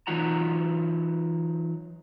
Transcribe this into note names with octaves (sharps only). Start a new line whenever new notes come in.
E3 F#3 D#4 F4 F#5 A#5